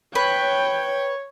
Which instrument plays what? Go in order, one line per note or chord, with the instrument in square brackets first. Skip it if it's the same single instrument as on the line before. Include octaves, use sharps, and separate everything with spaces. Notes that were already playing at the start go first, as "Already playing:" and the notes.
[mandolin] B4 [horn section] C#5 [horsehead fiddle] G5